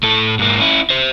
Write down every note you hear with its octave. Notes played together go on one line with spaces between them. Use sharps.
A2 A4
G#2 A#3
C#4 E4
C5 E5